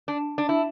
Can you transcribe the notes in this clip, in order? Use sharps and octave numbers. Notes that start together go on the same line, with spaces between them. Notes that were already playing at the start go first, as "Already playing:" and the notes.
D4
D4
E4